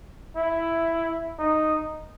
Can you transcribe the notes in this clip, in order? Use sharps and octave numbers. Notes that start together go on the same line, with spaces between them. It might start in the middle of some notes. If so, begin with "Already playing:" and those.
E4
D#4